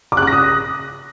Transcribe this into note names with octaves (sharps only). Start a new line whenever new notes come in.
D6
F#6
D6
A#6
D#6